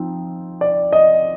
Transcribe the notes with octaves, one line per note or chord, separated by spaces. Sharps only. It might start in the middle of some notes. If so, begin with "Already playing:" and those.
Already playing: F3 C4 D#4
D5
D#5